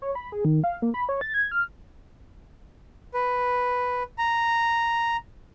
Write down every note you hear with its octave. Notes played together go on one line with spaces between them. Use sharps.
C#5
B5
G#4
D#3
F5
A#3
B5
C#5
A6
G#6
F6
B4
A#5